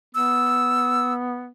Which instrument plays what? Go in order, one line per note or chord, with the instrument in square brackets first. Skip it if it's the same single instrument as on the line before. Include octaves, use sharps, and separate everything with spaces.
[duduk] B3 [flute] E6